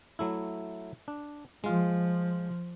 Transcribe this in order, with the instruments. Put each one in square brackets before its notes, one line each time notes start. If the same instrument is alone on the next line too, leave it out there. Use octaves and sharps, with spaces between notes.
[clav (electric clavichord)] F#3 A3 E4
D4
[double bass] F3 [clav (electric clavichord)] G#3 F4